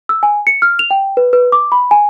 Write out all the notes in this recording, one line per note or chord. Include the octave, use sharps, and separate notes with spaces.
E6
G#5
C#7
F6
F7
G5
B4
B4
D6
B5
G#5